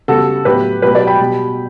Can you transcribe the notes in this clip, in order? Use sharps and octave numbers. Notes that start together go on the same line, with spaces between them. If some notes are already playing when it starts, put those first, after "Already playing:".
C#3 G3 B3 F#4 A4
A2 F#3 B3 G4 B4
B2 F#3 B3 G4 B4
B4 D5
G5 B5
B2 G3 B3